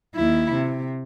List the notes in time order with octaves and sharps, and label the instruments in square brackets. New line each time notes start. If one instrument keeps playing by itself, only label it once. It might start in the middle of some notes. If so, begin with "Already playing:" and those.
[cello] D#2 E4
C3